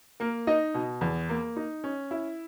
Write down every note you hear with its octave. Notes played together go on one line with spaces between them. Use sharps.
A#3 A#4
D#4 D#5
B2
E2
A#3
D#4
C#4
E4